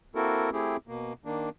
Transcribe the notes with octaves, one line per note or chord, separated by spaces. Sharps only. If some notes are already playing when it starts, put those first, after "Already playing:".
A#3 C4 E4 F#4 A4 A#4
A3 C4 E4 G4 G#4
B2 A#3
D#3 A#3 D4